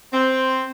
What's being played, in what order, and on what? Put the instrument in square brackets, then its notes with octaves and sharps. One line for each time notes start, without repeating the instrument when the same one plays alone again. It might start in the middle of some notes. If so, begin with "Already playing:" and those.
[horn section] C4